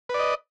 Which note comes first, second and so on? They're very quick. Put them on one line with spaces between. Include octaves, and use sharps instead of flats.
B4 D5 D#5